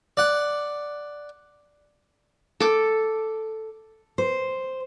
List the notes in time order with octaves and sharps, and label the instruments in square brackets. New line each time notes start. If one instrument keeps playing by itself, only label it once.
[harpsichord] D5 F#5
[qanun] A4 D6
[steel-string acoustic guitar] C5